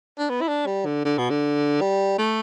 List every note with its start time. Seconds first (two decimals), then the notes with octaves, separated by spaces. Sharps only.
0.19 D4
0.30 B3
0.41 E4
0.48 D4
0.66 G3
0.86 D3
1.05 D3
1.18 B2
1.30 D3
1.81 G3
2.18 A3